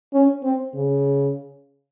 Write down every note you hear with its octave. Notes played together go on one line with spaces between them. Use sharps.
C#4
C4
C#3